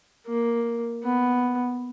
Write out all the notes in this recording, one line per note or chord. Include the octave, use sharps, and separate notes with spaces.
A#3
B3